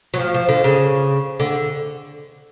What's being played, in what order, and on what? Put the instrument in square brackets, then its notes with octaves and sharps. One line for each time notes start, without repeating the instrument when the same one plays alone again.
[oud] F#3
F3
F3
D3
C#3
D3